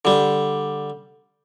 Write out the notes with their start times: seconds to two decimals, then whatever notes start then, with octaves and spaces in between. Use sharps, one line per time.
0.05 D3 G3